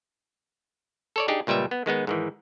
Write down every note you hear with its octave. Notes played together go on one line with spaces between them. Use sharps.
A4 C#5 D5
D4 D#4 G4 G#4
C#2 A#2 G3 B4 E5
B3
D#3 G#3 B3 D#4
G#2 D#3 E3